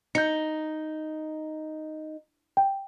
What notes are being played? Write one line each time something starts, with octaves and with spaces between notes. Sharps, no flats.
D#4 G6 C#7
G5